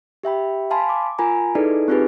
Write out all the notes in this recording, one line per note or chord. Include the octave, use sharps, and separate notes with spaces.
G4 E5 G5 B5
F5 G#5 A5 B5 C6
D6
F4 A#4 G#5 A#5 B5
D#4 E4 G#4 A4 B4 D5
C4 D#4 F4 G4 G#4 B4